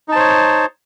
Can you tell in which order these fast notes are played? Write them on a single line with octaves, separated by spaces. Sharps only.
D#4 A5 C5 C#5